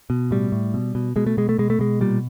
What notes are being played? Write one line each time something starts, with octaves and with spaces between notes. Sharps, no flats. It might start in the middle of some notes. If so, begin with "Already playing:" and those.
B2
A2 G3
A2
B2
B2
B2 G#3
A3
B2 G#3
A3
B2 G#3
A3
B2 G#3
A#2 G3